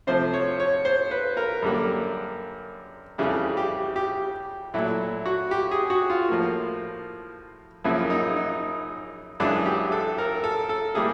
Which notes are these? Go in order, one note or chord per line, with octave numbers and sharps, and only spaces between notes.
C3 F3 A3 C5
C#5
C#5
C5
B4
A#4
F#2 D3 G3 A#3
F2 C#3 E3 G3
G4
G4
A#2 F#3 A3 E4
F#4
G4
G#4
F#4
F4
A2 F3 A#3
F#2 C#3 F3 A#3 E4
D#4
D#4
F#2 C#3 E3 G#3 D4
G4
A4
A#4
A4
A4
A2 E3 G3 A#3 G#4